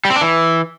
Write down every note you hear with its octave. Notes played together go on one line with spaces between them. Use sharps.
G3
C4
D4
E3